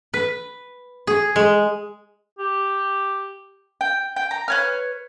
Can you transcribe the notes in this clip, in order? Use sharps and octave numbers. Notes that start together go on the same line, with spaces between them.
B4
G#4
G#3
G4
G5
G5
A#5
B4 C#5 F6